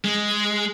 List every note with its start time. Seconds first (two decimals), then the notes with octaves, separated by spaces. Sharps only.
0.05 G#3